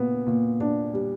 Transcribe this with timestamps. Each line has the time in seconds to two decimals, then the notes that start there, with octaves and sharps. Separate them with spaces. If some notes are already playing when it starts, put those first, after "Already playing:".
Already playing: A#2 B3
0.27 A#2
0.60 D4
0.94 G3